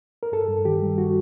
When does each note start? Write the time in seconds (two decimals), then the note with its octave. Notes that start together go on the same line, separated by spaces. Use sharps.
0.23 A#4
0.32 G2 A4
0.48 G2
0.65 D#3 G4
0.82 G3
0.98 F#4